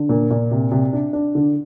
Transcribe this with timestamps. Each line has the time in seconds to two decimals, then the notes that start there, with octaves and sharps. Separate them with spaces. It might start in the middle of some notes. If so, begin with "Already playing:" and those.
Already playing: D3
0.09 A#2
0.31 A#2
0.51 C3
0.72 C3
0.93 D4
1.13 D4
1.35 D3